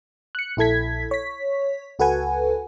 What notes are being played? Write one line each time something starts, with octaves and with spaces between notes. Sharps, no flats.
F#6 C#7
A#1 E4 A4 G#6 B6
C#5 B6
C#2 F#4 A4 B4 F#5 G#5